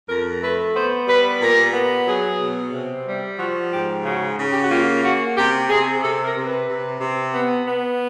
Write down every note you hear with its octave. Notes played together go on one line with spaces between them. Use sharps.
F2 A#4
A3 B4
B3 C5
G3 B4
A#2 A#4
B3
F#3 G#4
B2
C3
G3
F3 F#4
G#2 G4
C#3 F#4
C#3
G4
F#4
A#3 F4
A#3 F#4
C3 G4
C3 G#4
C3 A4
A#4
C3
B4
C3
C3
B3
B3